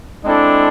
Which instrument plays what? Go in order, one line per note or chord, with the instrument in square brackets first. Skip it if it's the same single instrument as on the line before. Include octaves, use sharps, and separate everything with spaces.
[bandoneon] G#3 C4 E4 A4 [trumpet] D4